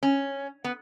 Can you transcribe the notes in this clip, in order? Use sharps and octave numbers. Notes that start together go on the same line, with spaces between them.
C#4
B3